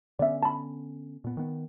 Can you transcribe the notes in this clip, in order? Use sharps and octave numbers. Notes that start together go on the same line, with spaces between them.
D3 B3 C#4 D5 E5
A5 B5
A#2 B3
D#3 B3